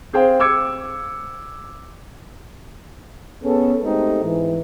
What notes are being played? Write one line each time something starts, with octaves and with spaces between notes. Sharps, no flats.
C4 G#4 C5 F5 G5
D6 E6 G#6 C#7
B3 C#4 G#4 A4
G#3 A3 C4 D#4 G4
G#2 E3